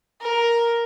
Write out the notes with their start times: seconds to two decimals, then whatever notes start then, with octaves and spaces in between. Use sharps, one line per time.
0.21 A#4